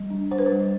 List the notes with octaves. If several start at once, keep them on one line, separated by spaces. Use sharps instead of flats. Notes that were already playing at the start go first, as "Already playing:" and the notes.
Already playing: G3
D4
D4 C5
B4
C5
G3